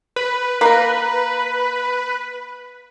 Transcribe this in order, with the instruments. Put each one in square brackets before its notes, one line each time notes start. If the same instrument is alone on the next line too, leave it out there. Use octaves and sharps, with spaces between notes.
[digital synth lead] B4
[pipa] A#3 A#4 [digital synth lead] B4